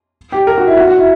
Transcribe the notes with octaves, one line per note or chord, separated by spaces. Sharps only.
G4
A#4
F#4
E4
F#4
F#4
E4